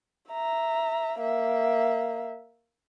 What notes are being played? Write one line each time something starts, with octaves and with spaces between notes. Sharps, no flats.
E5 A#5
A#3 E5